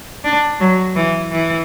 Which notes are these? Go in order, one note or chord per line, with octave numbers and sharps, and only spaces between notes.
D4
F#3
E3
E3